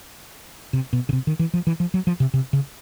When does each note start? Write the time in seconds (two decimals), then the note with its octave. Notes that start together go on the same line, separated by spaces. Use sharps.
0.73 C3
0.93 B2
1.09 C#3
1.13 C3
1.27 D#3
1.39 E3
1.54 F3
1.67 E3
1.80 F3
1.94 F#3
2.07 F3
2.20 C3
2.34 C3
2.53 C#3